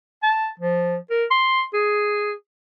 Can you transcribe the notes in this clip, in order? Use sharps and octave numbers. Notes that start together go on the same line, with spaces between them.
A5
F3
A#4
C6
G#4